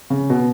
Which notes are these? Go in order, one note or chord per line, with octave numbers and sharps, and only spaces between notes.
C#3
B2